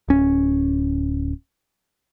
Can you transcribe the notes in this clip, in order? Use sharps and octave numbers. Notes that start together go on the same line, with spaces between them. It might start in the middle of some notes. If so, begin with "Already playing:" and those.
D1 C#4